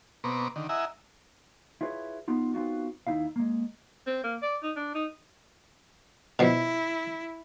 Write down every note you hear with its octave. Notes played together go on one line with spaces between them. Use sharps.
B2 B3 C4 A#5 C#6 D6
D3 D#3
E4 D#5 E5 F#5 G#5 A#5
E4 F4 G#4 B4 C#5
B3 D#4 F4
B3 C4 D#4 F4 F#4
D#2 D#4 E4 F5
G#3 A#3
C4
A#3
D5
D#4
D4
D#4
B2 F3 E4